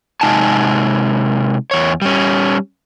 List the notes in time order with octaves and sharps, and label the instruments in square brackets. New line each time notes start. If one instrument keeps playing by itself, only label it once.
[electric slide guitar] C3 G#3 D#4 F#5 G#5 A5
E2 C#5
G3 C#4